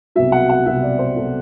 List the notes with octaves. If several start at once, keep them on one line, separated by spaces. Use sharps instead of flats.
C2 B2 F#3 E5
F#5
F#5
C2 B2 F#3 E5
D5
C5
B2 F#3 A4